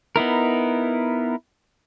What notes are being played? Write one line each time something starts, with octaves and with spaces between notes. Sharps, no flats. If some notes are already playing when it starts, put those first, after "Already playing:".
B3 D#4 E4 A#4